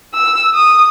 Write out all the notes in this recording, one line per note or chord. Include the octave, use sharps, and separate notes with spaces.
E6
D#6